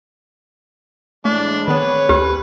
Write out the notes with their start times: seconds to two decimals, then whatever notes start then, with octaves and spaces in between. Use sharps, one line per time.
1.25 A2 E3 G#3 A3 D4
1.68 D#3 B3 C4 G#4 B4 C#5
2.09 D2 G4